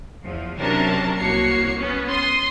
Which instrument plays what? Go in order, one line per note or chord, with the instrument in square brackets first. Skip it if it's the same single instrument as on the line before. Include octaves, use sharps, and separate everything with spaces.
[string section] E2 F3
C3 F#3 C#4 D4 A#4 A5
C2 A#3 F#4 C#5 C7 C#7
B3 C#4
C6 D#6